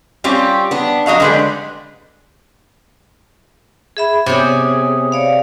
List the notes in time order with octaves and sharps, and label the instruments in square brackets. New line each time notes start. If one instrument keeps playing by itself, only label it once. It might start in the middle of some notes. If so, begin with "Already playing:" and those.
[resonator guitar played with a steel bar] G3 C4 C#4 F4 G4
B3 D4
F#3 D#5 F5 F#5
D3 G3 G#3 B4 D5
[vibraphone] G#4 E5 B5
[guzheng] C3 G#4 [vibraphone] B3 C#5 D#6
[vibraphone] C#5 D5 F5